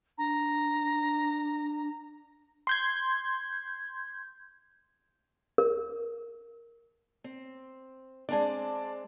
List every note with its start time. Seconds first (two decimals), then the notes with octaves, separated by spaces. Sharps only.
0.18 D4 A#5
2.67 C6 G6 G#6
5.58 A#4
7.24 C4
8.29 G#3 C4 D4 D5 A5